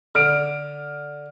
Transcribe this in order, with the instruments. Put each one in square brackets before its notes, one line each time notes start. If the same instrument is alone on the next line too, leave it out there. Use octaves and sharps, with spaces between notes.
[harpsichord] D3 [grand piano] F6 D7